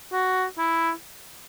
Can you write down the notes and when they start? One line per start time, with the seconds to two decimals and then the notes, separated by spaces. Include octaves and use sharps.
0.13 F#4
0.58 E4